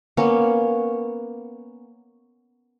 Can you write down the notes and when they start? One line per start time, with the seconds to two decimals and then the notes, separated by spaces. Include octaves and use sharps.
0.17 A#3 B3 C#4